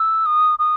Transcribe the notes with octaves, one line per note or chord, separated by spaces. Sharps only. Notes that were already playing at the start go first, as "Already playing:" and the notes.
Already playing: E6
D#6
D#6